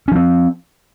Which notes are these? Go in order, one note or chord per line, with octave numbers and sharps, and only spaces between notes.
F3 C4 C#4